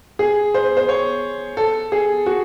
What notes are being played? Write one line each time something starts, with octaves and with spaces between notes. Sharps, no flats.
G#4
C5
C5
C#5
A4
G#4
F#4